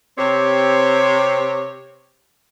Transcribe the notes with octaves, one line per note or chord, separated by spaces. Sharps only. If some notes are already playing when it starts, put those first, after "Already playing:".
C3 C4 G4 C#5